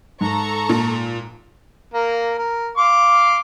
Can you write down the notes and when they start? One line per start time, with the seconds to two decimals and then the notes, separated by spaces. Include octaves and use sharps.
0.21 G#2 A4 A#5 C#6
0.69 A#2
1.94 A#3 A#4
2.38 A#4
2.77 F5 C6 D6